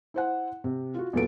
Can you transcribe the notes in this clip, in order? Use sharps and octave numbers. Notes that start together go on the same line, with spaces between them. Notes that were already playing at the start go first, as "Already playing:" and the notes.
E4 C5 F#5
C3
F4 F#4
E2 A#2 F#3 A4 B4 D7